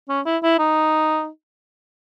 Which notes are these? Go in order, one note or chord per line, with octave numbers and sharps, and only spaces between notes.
C#4
E4
E4
D#4